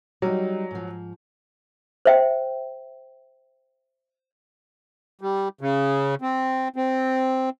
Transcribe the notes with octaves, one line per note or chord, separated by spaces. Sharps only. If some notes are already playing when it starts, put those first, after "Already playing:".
F#3 G3 D#4
G#2 F3
C5 E5 G5
G3
C#3
C4
C4